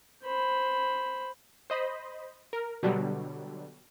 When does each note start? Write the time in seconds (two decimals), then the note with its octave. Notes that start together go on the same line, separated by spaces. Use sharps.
0.24 C5 B5
1.70 C5 D#5 B5
2.53 A#4
2.83 B2 D3 F#3 G3